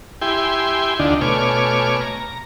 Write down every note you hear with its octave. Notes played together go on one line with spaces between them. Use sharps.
E4 G4 G5 G#5 C6
D2 D3 D4 D#4 F4
B2 A3 C#5 G#5 D6 F6
A#5